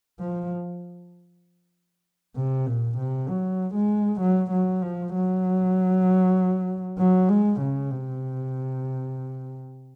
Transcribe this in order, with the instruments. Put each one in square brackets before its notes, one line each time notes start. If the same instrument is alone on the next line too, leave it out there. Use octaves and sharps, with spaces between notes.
[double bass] F3
C3
A#2
C3
F#3
G#3
F#3
F#3
F3
F#3
F#3
G#3
C#3
C3